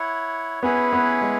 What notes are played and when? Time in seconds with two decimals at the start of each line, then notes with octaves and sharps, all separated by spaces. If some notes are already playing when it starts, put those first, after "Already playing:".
Already playing: E4 C#5 F#5
0.63 B3 C#4 E4 G#4 B4 F#5
0.93 B3
1.21 G#3